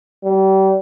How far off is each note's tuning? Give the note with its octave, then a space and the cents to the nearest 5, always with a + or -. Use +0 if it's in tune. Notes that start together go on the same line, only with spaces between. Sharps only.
G3 -30